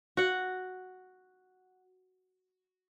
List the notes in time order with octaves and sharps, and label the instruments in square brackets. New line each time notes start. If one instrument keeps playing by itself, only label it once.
[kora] F#4 F#5